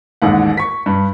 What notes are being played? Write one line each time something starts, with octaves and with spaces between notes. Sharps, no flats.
A1 D#2 G#2 F#5
C#6 B6
G2